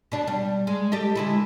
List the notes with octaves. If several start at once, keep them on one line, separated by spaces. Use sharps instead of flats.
B2 D4
G3
G#3
G4 A4 D#5
D3 G#3 E4